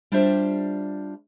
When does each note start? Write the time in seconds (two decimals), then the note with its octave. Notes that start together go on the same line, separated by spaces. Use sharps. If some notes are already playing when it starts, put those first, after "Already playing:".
0.12 G3 D4 F4 G4 C5 E5